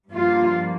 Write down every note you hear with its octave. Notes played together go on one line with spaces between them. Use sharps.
G2 F3 A#3 F4